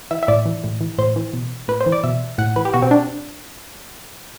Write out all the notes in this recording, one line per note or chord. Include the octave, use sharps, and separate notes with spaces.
E3 E5
E5
A2 D5
E3
A2
E3
A2 C5
E3
B2
A2 B4
C5
E3
D5
B2 E5
A2 F#5
E3 B4
G4
B2 F#4
C4
D4